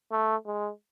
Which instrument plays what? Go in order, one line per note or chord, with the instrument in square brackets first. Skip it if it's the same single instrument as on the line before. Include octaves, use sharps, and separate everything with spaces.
[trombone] A3
G#3